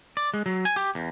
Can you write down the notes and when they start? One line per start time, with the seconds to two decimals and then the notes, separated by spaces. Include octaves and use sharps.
0.17 D5
0.34 G#3
0.46 F#3
0.65 G#5
0.76 G4
0.95 E2